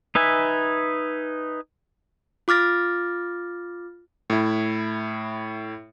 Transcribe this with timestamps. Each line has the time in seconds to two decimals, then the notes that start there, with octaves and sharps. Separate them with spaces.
0.15 D#4 B4 E5 G#5
2.48 F4 D6 F6 A6 A#6
4.30 A2 E4